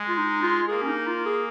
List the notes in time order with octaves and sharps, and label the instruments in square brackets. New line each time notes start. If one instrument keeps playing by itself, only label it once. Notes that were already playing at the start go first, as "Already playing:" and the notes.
Already playing: [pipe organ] G#3
[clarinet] F4
D#4
F4
[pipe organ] A#3 [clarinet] G#4
[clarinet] C#4
D#4
F4
G#4